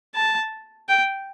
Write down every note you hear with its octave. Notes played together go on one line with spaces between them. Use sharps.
A5
G5